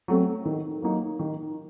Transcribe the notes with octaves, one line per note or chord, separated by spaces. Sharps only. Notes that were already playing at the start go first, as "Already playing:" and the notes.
F#3 A3 C4
D#3
F#3 A#3 D#4
D#3